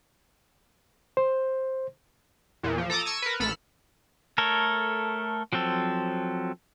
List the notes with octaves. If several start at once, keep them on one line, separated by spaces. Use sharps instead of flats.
C5
E2 A#2
F3
A4 A#5 D6 D#6
C#6 E6 G#6 D#7
A#4 B4
A1 A4 B5 F6 C#7 E7
A3 A4 A#4 C#5
F3 F#3 C4 A4